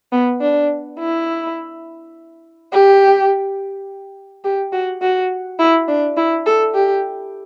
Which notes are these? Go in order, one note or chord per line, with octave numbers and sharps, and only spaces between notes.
B3
D4
E4
G4
G4
F#4
F#4
E4
D4
E4
A4
G4